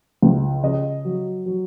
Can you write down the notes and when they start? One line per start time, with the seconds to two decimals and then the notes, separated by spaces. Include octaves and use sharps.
0.22 C#2
0.63 C#3 D#5
1.05 F#3
1.46 F#3